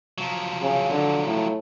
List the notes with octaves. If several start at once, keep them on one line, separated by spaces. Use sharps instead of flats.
F3 F#3
C#3
D3
A2